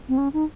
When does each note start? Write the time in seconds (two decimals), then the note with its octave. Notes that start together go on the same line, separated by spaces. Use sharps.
0.09 C4
0.18 C#4
0.33 D#4